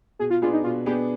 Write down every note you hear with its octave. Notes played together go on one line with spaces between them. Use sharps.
B2 G#4
F4
B3 D4 F4 G#4
D#4
B2 F4
B3 D4 G4 G#4